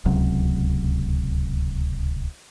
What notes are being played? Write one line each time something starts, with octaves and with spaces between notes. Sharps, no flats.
D1 C#2 C3 F#3